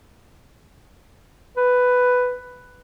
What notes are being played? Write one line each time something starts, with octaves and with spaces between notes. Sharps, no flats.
B4